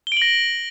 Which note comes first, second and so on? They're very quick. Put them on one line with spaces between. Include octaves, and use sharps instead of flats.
G7 D7 F#7 A#6